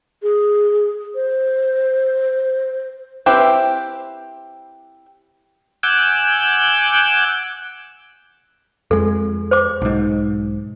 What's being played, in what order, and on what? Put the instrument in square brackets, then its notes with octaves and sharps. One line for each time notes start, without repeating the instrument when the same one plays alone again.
[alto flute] G#4
C5
[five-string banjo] C4 E4 G4 B4 C5
[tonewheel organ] F#5 G#5 D6 E6 F#6 G6
[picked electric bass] F2 G#3 [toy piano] A4
[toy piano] C5 D6
[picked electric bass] B1 G#2